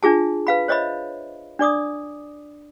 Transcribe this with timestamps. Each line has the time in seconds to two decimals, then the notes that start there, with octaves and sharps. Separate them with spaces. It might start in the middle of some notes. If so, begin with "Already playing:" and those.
0.03 D4 F4 G#4 A5
0.47 B4 F5 B5
0.68 C5 C#5 D#5 E5 B5
1.59 D4 D5 D6 D#6